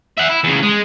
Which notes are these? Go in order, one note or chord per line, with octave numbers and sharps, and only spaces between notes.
E5 F#5
E4
E2 C#3
G#3